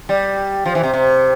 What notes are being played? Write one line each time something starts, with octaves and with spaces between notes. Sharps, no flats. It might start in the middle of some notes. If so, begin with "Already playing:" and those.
G3
F3
E3
C3
C3